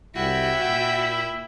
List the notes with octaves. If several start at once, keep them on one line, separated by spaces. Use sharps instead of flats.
C2 E4 F#4 E5 G5
A#2